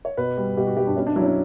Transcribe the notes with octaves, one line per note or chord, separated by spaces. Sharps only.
C#5
B2 B4
G3
B2 G4
F#4
G3 G4
D4
B2 C#4
D4
F#3 E4
C#4
D4